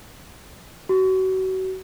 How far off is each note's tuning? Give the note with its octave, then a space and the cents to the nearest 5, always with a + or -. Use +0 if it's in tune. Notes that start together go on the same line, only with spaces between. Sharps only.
F#4 +30